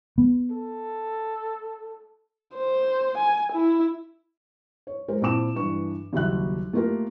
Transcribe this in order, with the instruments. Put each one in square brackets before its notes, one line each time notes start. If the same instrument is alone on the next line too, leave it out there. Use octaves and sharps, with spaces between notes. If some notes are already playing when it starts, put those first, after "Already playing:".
[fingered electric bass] B3
[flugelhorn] A4
[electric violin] C5
G#5
E4
[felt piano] C#5
G#3 G4 A#4 C5
A#2 C4 E4 A5 D6 E7
G2 E3 D4 C#6
F#1 D#2 G3 F#4 E5 F#6
A3 A#3 F4 G4 A#4